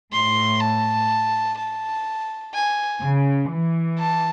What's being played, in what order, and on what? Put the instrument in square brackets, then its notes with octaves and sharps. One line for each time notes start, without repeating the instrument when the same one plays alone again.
[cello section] A2 [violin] C6
[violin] A5
A5
G#5
[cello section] C#3
E3
[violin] A5